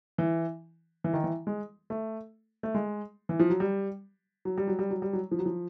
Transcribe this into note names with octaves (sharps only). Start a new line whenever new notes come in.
E3
E3
D#3
E3
G#3
A3
A3
G#3
E3
F3
F#3
G3
F#3
G3
F#3
G3
F#3
G3
F#3
F3
F#3
F3